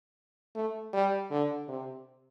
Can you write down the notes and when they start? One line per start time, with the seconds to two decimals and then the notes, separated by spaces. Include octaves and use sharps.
0.55 A3
0.93 G3
1.31 D3
1.68 C3